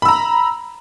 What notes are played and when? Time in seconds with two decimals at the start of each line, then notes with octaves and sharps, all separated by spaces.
0.02 B5
0.05 E6
0.08 A#5